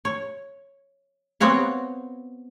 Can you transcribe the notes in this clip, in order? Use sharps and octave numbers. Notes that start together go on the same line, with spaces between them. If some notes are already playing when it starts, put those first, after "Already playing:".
C#5
B3 C4 F#4 C#5 F5